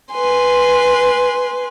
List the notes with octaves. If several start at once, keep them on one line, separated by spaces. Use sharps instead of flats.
B4 G#5 C6